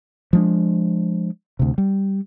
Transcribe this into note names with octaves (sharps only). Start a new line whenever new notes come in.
F3 G#3 D4
D2 C3
G3